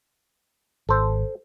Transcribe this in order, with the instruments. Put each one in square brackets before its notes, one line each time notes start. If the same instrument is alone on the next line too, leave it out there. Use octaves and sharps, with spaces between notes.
[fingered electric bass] G#1 [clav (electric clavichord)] A4 C5